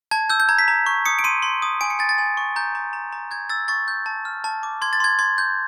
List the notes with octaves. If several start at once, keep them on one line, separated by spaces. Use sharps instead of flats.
A5 G#6
E6 G6
G6
A#5 G#6
B6
A#5
C#6
D#6 C#7
D7
C6 D#7
C6
D#6
G#5 D7
C#7
G#5 A6
A6
G#5
C#6
A#5 G6
A#5
A#5
A#5
G6 G#6
E6 A6
C#6 A6
G6
A5
F6
A5
D6
C6 G#6
A6
C6 G#6
C6 G#6
G6